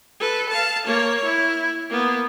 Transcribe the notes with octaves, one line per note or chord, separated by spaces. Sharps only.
A4 B4
F5 A5
A#3 C#5
E4
A#3 B3